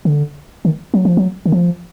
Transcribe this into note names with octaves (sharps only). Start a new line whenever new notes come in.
D3
D#3
F#3
F3
F#3
D#3
F3